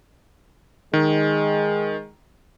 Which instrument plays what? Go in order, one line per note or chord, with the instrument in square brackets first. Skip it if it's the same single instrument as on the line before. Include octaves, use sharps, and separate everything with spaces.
[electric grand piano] D#3 [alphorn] G#3